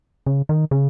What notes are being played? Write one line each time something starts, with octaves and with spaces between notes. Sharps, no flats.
C#3
D#3
C#3